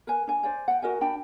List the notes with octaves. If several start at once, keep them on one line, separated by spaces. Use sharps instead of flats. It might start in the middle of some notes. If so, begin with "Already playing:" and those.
A#4 B4 G#5
D4 G#5
C5 D5 G#5
F#5 G5
F#4 A#4 D#5 G#5
D4 G5 A5 B5